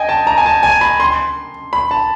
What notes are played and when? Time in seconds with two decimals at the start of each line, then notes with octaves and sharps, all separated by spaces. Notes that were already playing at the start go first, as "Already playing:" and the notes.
Already playing: D#5 G5 G#5
0.09 A5
0.27 A#5
0.38 G#5
0.46 A5
0.63 G#5
0.81 B5
1.00 C6
1.73 B5
1.91 A5